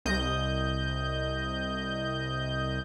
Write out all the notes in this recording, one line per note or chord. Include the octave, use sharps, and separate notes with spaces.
C2 D#5 G6